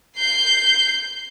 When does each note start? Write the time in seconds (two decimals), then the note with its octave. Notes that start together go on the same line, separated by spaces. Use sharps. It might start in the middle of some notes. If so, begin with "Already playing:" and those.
0.16 G6 C7